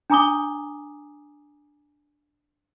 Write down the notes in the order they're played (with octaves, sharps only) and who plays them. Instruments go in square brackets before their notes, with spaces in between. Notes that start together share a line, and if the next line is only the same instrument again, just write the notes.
[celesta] D4 G#5 A#5 D6 D#6 G7